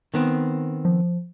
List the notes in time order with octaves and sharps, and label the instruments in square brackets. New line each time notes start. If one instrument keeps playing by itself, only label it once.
[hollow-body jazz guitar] D#3 B3 C4
[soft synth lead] F3